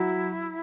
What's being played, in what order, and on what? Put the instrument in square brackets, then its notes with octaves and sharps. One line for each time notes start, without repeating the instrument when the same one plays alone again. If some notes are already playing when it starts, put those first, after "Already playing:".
Already playing: [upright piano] F#3 [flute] E4